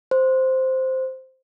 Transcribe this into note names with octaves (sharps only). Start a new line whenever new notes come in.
C5